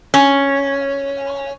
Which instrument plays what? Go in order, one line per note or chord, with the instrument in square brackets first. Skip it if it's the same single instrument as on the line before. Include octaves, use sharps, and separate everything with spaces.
[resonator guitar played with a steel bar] C#4